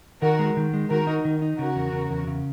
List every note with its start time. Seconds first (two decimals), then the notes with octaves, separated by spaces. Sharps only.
0.22 D#3 F#4 A#4
0.39 G#3
0.57 D#3
0.73 G#3
0.90 D#3 F#4 A#4
1.07 D#4
1.25 D#3
1.42 D#4
1.58 C#3 F#4 A#4
1.75 E2
1.92 C#3
2.10 E2
2.27 C#3